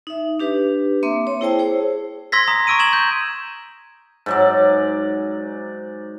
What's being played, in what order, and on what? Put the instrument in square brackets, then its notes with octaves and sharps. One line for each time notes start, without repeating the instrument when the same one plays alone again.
[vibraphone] D#4 E5
D4 G4 B4
A#3 C4 E5 C6 D6
C#5
E4 G#4 C5 G5 A5 E6
G#4 C5 C#5
[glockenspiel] C6 E6 G#6 A#6 B6
A#5 D#6
A#5 C#6 E6 D7 D#7
G#6 E7 F#7
G6
[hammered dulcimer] G#2 F#3 D5